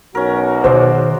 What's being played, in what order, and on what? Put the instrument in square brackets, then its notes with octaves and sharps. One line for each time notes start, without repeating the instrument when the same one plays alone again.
[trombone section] B1 F#4 [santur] C#4 A#4
[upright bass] B2 D#3 [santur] F#3 G#3 D5 [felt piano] C5